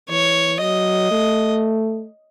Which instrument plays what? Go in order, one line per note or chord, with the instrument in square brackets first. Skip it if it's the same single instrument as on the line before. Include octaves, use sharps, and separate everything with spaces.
[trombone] E3 [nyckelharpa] C#5
[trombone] F#3 [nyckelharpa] D#5
[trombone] A3